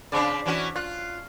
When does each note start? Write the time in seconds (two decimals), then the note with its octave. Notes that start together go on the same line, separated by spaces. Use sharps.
0.12 C#3 C4 D4 D5
0.46 E3 C#4 F#4
0.76 F4 F#6